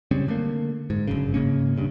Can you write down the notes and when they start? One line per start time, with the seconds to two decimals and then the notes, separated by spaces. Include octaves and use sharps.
0.11 C#3 G3 C4 C#4
0.28 D3 A3 A#3
0.90 G#2
1.08 G1 F#2 C#3
1.34 G#2 C#3 A#3 C#4
1.76 D#1 G2 C#3